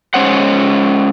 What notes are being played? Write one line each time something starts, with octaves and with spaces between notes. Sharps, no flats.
G#3 C#4 C5 F#5